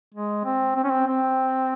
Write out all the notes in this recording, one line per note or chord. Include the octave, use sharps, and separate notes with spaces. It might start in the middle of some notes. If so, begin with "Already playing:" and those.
G#3
C4
C4
C#4
C4
C4